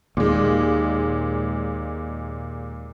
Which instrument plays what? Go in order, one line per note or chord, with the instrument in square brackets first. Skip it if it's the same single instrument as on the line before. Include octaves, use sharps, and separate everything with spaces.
[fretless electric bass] D#2 [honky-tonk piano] A#2 G#3